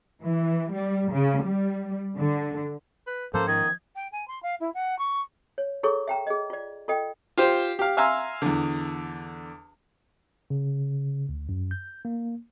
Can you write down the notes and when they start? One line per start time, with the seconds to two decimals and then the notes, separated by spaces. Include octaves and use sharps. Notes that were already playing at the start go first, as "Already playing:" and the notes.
0.22 E3
0.73 G3
1.13 C#3
1.45 G3
2.17 D3
3.07 B4
3.34 G#2 F3 A#3 C#4 A4 C5
3.48 D#3 D#5 G#6
3.95 G5
4.12 G#5
4.28 C6
4.42 F5
4.60 E4
4.74 F#5
4.98 C#6
5.58 C#5
5.83 E4 G#4 A4 C#5 C#6
6.08 E5 G5 A#5
6.27 G#4 D#5
6.50 F4 D5
6.88 F4 A4 D#5 G5
7.38 F4 G4 C5
7.79 G4 F5
7.97 E5 F5 G#5 A#5 C6 E6
8.42 E2 D3
10.50 C#3
11.29 D2
11.49 F#2
11.71 G6
12.05 A#3